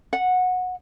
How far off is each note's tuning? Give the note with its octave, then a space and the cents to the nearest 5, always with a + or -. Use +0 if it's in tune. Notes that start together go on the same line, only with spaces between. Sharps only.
F#5 -15